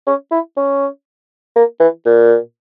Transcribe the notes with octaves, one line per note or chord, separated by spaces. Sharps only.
C#4
E4
C#4
A#3
E3
A#2